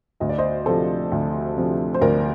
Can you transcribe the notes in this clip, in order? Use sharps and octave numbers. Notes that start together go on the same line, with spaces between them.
D2 D#5
D5
C5 D#5
C3 F3 A4 C5
D2
C3 F3
C5
D2 A#4 D5